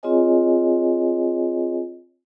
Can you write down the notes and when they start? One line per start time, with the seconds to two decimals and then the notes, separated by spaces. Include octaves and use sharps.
0.03 C4 F4 G#4 C#5 D#5 G#5